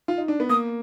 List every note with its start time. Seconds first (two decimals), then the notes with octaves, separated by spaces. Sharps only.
0.08 F4
0.18 D#4
0.28 D4
0.40 B3
0.49 A#3 D#6